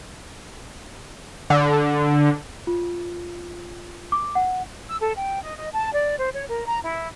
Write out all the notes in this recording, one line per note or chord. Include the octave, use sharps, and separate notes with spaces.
D3
F4
D6
F#5
E6
A4
G5
D#5
D#5
A5
D5
C5
C#5
A#4
A#5
E4